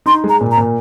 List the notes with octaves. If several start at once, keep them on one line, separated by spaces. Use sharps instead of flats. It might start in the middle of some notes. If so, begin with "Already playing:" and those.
D#4 C6
G#3
A#5
A#2
A#5
A#2